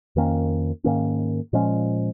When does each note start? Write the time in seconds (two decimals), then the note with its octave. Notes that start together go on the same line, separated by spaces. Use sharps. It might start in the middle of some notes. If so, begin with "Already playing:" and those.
0.16 F2 D#3 A#3 C#4
0.84 G#2 D#3 A#3 C#4
1.53 A#2 F3 G#3 C#4